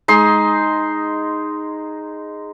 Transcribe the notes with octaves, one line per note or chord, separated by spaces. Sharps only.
G#3 D#4 C6